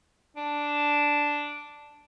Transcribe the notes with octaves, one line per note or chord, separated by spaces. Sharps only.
D4